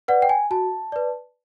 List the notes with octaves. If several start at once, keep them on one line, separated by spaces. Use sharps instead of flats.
B4 D5 F#5
G5
G#5
F#4 A5
B4 D5